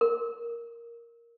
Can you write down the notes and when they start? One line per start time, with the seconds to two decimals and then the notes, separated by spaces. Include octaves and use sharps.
0.01 A#4